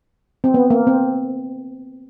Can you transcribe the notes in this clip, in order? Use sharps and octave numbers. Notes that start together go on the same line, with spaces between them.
C4
B3
A#3
C4